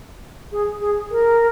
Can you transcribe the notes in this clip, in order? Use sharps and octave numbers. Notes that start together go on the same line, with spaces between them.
G#4
G#4
A#4